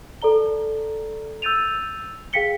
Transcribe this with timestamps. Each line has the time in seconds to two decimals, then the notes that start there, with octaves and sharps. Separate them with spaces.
0.22 A4 D5 A#5 G7
1.42 E6 G6 A6 D#7 F7
2.33 G#4 F5 G5 B6 C#7 G7